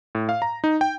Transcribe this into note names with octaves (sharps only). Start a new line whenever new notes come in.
A2
F5
A#5
D#4
G5